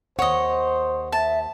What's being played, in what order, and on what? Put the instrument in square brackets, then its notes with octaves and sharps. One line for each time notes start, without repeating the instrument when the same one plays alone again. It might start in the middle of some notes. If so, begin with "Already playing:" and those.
[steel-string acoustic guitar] D#2 F#5 [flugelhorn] C5 [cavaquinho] C#5 D#5
[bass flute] E5 [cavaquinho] A5